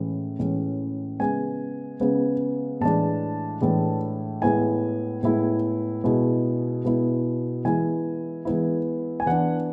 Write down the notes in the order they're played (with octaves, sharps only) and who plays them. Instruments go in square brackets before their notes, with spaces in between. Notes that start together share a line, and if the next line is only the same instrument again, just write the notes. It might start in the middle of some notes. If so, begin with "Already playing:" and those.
Already playing: [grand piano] A2 E3 G#3 C#4
A2 E3 G#3 C#4
C#3 G#3 B3 G#5
C#3 G#3 B3
A2 E3 G#3 D4 A5
A2 E3 G#3 D4
A2 G#3 B3 E4 G#5
A2 G#3 B3 E4
B2 G#3 B3 E4
B2 G#3 B3 E4
E3 G#3 B3 E4 G#5
E3 G#3 B3 E4
G#5
E3 B3 D4 F#5